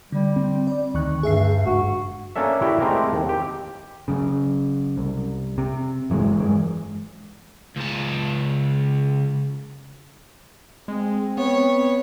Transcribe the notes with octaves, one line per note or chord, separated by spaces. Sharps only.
D3 G3
C4
D5
D2 D#3 C#6 F#6
D2 G2 A3 G#4 E5 C7
F#1 G#2 F#4
A#3 C#4 D4 A4 E5
E4 F#4 G4 D5 G5
G#3 A3 C4 G4 A#4
D#2
G4
F#1 F#2 C#3
C2
C3
G1 E3 F#3 G#3
G2 E3 G#3
C#2 A5
G#3 C4
B3 C#5